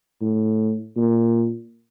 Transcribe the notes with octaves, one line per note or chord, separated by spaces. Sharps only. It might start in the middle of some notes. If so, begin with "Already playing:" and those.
A2
A#2